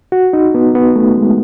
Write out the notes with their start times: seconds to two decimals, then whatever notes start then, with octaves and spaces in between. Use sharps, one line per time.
0.12 F#4
0.33 D#4
0.55 B3
0.75 B3
0.96 A3
1.18 G#3